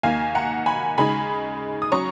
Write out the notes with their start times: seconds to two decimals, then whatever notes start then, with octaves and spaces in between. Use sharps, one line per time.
0.03 D#2 D#3 A#3 F5 G#5
0.35 F#5 A#5
0.66 G#5 B5
0.98 C#3 G#3 D#4 G#5 B5
1.82 D#6
1.92 F#3 C#4 A#5 C#6